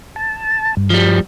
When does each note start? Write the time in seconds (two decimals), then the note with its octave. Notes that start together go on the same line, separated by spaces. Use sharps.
0.16 A5
0.77 G2
0.90 F3 G3